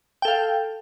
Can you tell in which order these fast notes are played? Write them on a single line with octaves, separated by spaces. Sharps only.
G5 A4 F5